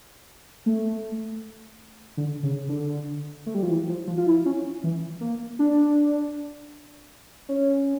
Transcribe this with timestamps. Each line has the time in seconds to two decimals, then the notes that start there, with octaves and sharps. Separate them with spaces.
0.66 A3
2.17 D3
2.43 C#3
2.69 D3
3.46 A3
3.54 G3
3.63 F3
3.70 E3
3.89 F3
4.07 F3
4.18 F4
4.26 E4
4.45 C#4
4.84 E3
5.21 A#3
5.59 D4
7.49 C#4